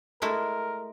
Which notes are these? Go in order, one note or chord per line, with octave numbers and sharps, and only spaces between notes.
G#3 A3 E4 A#4